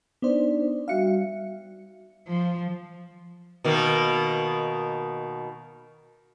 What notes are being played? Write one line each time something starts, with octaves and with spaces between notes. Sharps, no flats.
B3 D4 D#4 C5 D5
G3 F#4 E5 F5 C#7
F3
B2 D#3 A#3